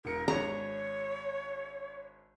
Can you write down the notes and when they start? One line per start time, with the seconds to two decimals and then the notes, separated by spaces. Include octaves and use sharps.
0.05 E1 A#4 C#7 D7
0.28 G#1 D4 G#4 C#5 A#5 B5